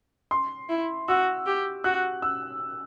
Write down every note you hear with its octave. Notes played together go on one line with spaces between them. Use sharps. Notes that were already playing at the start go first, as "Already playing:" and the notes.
C6
E4
F#4 E6
G4
F#4 F#6
E6